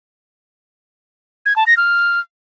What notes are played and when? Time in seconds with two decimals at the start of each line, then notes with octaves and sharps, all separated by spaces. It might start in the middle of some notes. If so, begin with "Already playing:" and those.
1.46 G#6
1.56 A5
1.66 A#6
1.77 F6